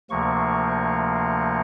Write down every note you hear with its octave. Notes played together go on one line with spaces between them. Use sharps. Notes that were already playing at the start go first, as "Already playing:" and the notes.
D2 C3 F3 A#3 C#6